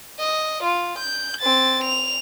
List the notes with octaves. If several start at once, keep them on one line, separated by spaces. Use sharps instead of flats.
D#5
F4
G6
C4 A6
F7